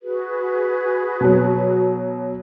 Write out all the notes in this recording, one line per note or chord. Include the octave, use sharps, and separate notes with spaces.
F#4 G#4 B4
B2 F#3